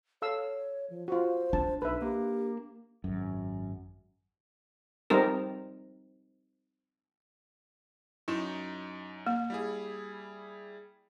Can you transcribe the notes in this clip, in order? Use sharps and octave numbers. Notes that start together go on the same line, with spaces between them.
A4 C#5 F5 E6
F3
F4 F#4 C5
D4 A5
B1 D#4 B4 E5
A#3 G4
G#1 F#2
G3 C4 D#4 A#4
F#2 D#4 E4 E7
A#3
G3 E4 G#4